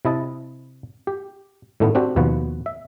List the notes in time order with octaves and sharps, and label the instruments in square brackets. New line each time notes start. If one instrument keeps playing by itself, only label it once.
[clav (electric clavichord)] C3 E4 D#5 A5
G4
A2 D#3 A3 B3
C4 D4 F#4 G4
D#2 B2 F3 B4 F#5
E5